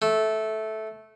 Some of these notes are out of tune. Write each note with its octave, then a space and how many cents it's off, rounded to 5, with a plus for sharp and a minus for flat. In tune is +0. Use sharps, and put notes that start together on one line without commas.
A3 -10